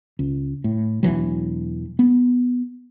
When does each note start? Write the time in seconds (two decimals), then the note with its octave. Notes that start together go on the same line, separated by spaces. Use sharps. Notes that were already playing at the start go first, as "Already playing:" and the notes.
0.19 C#2
0.64 A2
1.03 E1 B1 E3 F#3
1.99 B3